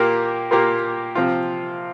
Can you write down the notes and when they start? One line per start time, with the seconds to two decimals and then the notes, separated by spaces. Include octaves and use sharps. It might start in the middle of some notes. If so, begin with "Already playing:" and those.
Already playing: A#2 A#3 G4 A#4
0.51 A#2 A#3 G4 A#4
1.15 C3 F3 C4 F4